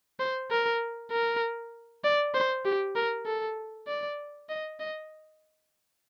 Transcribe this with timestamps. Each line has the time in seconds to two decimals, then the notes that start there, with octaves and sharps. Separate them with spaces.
0.20 C5
0.51 A#4
1.12 A#4
2.04 D5
2.34 C5
2.65 G4
2.96 A#4
3.26 A4
3.88 D5
4.49 D#5
4.80 D#5